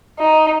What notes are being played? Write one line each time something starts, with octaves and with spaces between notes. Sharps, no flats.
D#4